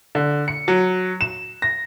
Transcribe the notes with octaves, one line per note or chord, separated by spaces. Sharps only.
D3
C#7
F#3
E7
A#6